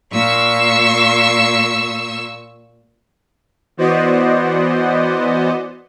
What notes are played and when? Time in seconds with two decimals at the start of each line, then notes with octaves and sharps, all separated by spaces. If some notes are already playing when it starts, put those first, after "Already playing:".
0.12 A#2 C#6 E6
3.77 E3 B3 F#4 C5 D5 D#5